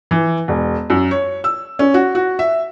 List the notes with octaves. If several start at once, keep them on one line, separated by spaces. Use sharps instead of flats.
E3
E1
F#2
C#5
E6
C#4
F#4
F#4
E5